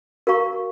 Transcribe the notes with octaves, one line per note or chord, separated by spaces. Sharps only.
F#4 A#4 F5 A#5 C#6